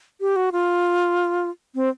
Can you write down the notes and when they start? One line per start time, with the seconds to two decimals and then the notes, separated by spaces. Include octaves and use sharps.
0.21 G4
0.36 F#4
0.52 F4
1.75 C4